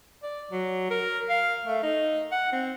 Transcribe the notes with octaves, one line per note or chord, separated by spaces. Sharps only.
D5
F#3
A#4
F5
A3
D#4
F#5
C4